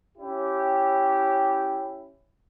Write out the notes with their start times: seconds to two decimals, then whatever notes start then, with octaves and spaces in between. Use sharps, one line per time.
0.18 C#4 E4 G4